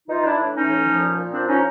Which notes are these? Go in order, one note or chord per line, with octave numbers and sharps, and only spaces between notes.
E3 D#4 F4
E3 D4 E4
A2
E3 C#4 D#4
A2
F3
A#2
A#2
F3 C4 D4
F3 C#4 D#4